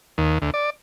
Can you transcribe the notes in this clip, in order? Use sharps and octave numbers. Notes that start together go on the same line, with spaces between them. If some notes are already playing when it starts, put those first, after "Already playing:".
D#2
D2
D5